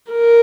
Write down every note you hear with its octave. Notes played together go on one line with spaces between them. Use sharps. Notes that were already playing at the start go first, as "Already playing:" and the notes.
A#4